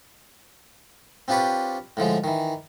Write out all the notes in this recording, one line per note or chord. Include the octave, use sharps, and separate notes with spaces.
C4 D4 F4 G4 B4 C#5
A2 D3 F3 G#3
D#3 E3